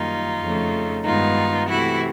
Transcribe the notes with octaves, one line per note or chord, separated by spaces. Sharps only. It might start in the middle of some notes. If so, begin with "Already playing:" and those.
Already playing: F#2 D#3 G3 A#3 D#4 F4
F2 C#3 F3 A3
G2 D#3 G#3 B3 D#4 F4
C3 E3 A3 E4 F#4